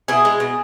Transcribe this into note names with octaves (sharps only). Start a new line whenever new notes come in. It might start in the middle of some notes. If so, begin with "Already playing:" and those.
B2 E4 G#4
G#3
B2